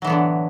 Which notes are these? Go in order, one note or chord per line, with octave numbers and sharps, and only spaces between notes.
A2 D3 E3 F#3 B3